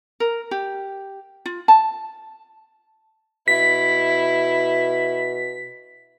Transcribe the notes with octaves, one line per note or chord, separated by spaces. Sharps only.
A#4
G4
F4
A5
B2 E4 B6